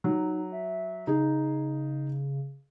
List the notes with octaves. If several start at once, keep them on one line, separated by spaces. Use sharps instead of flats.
F#3 D#4
E5
C#3 D#4 G#4